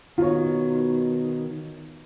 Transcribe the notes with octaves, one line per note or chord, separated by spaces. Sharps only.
B2 D#3 F4 C#5